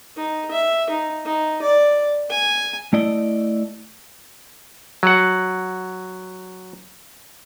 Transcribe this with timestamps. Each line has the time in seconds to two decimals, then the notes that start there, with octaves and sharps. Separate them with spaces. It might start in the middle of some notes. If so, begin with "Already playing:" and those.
0.16 D#4
0.51 E5
0.89 D#4
1.25 D#4
1.61 D5
2.29 G#5
2.93 A3 E4 D5 D#5
5.03 F#3 F#5